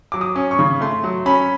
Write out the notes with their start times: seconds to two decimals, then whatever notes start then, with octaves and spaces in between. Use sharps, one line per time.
0.12 F#3 D6
0.21 D#6
0.36 C#4
0.51 C#6
0.59 C#3
0.81 A3 C6
1.04 F#3
1.26 C#4 B5